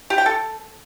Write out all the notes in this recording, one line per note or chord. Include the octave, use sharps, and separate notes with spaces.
G4
G5
A4